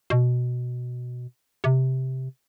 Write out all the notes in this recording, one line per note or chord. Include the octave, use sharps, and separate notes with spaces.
B2
C3